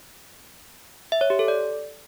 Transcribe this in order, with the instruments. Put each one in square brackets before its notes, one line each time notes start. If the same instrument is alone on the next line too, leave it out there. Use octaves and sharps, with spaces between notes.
[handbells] E5
C#5
G4
A4
D5